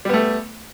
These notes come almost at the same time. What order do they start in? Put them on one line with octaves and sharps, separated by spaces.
G3 B3 A3